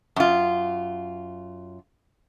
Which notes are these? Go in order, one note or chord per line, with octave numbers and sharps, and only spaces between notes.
F#2 F4